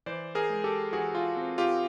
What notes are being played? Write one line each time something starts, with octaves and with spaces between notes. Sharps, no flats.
E3 C5 D5
G#4 A#4
G#3
G4 A4
E3 F#4 G#4
F4
C4
F4 G4